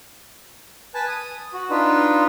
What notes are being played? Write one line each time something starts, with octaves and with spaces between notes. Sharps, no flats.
B4 G#5 A5
D#6
F#4
D4 D#4 F4 B4